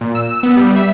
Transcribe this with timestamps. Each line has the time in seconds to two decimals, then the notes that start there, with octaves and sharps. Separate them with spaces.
0.01 A#2
0.15 E6
0.43 B3
0.57 G3
0.76 E5